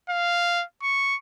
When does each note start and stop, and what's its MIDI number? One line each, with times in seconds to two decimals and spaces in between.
0.10 0.64 77
0.82 1.16 85